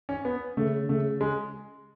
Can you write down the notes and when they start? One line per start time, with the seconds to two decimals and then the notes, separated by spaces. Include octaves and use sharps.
0.09 C#4
0.25 B3
0.57 C#3 A3
0.89 C#3 A3
1.21 G#3